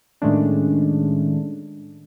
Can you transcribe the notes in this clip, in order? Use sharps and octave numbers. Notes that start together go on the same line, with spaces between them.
A2 D#3 G#3 A3 C#4 D4